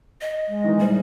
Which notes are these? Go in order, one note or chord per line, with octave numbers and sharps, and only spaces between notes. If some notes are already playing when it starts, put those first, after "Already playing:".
D#5
G#3
D#3 E3 D#4
A#1 G3 C5